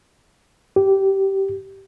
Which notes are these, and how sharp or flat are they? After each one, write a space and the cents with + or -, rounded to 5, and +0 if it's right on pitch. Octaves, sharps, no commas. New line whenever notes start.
G4 -15